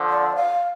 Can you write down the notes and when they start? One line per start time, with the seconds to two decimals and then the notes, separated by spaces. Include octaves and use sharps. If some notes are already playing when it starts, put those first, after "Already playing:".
Already playing: D3 F3
0.09 D5
0.36 F5